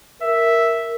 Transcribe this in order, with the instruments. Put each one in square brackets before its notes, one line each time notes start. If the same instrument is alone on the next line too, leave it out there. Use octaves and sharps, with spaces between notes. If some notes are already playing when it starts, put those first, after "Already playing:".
[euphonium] A#4 [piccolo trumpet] E5